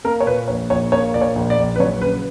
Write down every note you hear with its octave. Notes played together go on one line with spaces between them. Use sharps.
A#3 A#4
C#5
A#2 B4
A#1 C#5
A#1 C#5
A#3 C#5
A#2 D5
C#5
A#1
D5
A#1
B4
F#3 C#5
C#3 B4